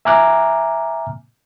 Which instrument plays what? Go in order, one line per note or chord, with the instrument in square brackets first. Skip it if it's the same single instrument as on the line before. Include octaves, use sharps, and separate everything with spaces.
[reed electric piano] E5 G#5 A#5 D6 F6 F#6